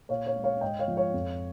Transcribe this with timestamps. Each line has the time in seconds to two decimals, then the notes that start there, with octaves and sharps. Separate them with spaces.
0.09 A#2 C#5 F5
0.26 C#5 F5
0.35 G#3
0.44 C#5 F5
0.61 G#2 D#5 G5
0.79 C#5 F5
0.88 F3 G#3
0.97 C#5 F5
1.13 F2